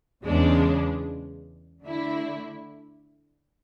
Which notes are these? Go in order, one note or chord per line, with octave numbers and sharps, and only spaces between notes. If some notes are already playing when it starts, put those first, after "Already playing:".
E2 C#3 G#3 D4
D3 A3 E4